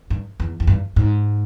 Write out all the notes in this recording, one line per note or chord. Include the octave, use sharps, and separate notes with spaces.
G2
E2
E2
G2
G#2